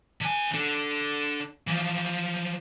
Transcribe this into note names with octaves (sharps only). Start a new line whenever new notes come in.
D3 G#5
D4 A4
E3 F3